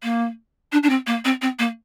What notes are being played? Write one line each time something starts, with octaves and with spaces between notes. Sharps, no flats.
A#3
D4
D4
C4
A#3
C4
C4
A#3